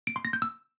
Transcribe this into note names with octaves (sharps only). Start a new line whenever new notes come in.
D7
C6
A#6
G6
E6